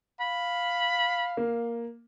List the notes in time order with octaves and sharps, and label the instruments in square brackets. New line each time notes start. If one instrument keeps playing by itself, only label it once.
[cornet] F5 [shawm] B5
[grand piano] A#3